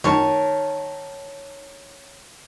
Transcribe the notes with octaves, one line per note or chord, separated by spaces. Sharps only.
D#3 C#5 A5